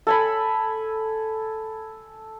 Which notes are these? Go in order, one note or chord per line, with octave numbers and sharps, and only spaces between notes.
A4 G#5 B5